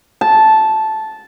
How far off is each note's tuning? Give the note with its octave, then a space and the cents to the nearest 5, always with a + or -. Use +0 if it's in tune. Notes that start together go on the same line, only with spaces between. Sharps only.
A5 -10